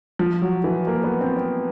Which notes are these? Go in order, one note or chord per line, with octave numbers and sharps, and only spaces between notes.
F3
F#3
E3
A#3
B3
C4
C4